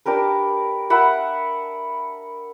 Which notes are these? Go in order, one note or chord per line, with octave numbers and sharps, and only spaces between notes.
D4 G4 A#4 B4
A#4 E5 F#5 B5